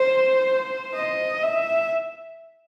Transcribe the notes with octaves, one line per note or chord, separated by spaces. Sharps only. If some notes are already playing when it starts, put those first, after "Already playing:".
Already playing: C5
D#5
E5